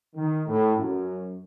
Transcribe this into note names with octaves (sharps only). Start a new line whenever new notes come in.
D#3
A2
F#2